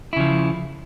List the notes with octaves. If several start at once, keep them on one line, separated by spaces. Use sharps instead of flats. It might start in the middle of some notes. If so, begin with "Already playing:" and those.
C#3 F3 E4